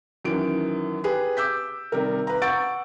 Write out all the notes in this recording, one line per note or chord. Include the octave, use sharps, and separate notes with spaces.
F#2 D#3 E3 D7
G4 G#4 B4
D6 E6 G6 B6
C3 D#3 G3 A#4
B4 A#5
F#5 C#6 E6 G6 A6 D7